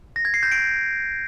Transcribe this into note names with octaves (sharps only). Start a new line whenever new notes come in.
A#6
G#6
C7
G6
D7